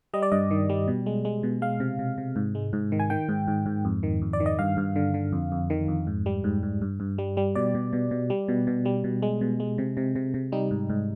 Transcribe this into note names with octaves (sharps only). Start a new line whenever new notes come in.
G3 D#5
D5
G2 D#5
D#3
G3
B2
G#3
G#3
B2
G#3 F5
C3
C3
C3
G#2
G#3
G#2
D#3
G#5
D#3 G5
G#2
G#2
G#2
F2
D#3
F2
D5
D#3
D#5
G2 F5
G2
D3
D3
F2
F2
D#3
F2
G#2
G3
G#2
G#2
G2
G2
G3
G3
B2 D5
B2
B2
B2
G3
B2
B2
G3
B2
G#3
B2
G#3
C3
C3
C3
C3
G3 D#4
G#2
G#2